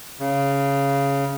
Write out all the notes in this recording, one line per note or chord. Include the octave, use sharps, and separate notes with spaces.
C#3